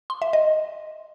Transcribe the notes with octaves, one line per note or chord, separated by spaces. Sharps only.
C6
E5
D#5